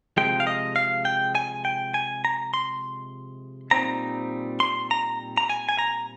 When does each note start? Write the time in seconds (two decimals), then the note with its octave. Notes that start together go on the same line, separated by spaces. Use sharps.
0.17 C3 F3 G#3 G5
0.40 F5
0.47 D#5
0.76 F5
1.05 G5
1.35 G#5
1.65 G5
1.94 G#5
2.25 A#5
2.54 C6
3.71 A#2 G3 C4 D#4 A#5
4.60 C6
4.91 A#5
5.38 A#5
5.50 G#5
5.69 G#5
5.79 A#5